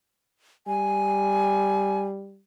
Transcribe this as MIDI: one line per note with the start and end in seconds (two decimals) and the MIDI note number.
0.67 2.40 55
0.67 2.02 80